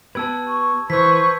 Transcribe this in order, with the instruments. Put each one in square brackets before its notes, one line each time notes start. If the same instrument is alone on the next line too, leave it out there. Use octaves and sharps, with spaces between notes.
[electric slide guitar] B3 G4 B4 [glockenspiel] A5 E6 G#6
[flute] C#6
[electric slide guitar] E3 [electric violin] B4 C#6 [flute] C5 [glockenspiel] E6 G#6 B6